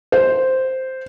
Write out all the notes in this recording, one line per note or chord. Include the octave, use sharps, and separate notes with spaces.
C5